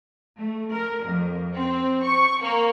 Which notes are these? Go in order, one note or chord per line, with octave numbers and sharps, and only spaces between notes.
A3
A#4
F2
C4
C#6
A#3